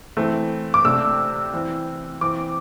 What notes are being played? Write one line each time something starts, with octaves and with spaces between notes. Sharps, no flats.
E3 A3 C4
D6
C3 A3 D4 E6
E3 C4
E3 C4 D6